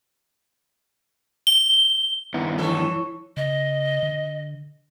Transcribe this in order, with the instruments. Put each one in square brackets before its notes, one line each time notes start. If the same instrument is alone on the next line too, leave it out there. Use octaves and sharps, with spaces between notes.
[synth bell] G7
[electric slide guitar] G2 D#3 F#5 [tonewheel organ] B3 E4
[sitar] E3 A4 [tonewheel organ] F3 [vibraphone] E4 C#5 C#6
[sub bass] C#3 [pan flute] D#5
[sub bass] D3